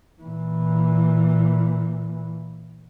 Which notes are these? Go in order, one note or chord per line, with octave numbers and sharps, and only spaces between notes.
A#2 E3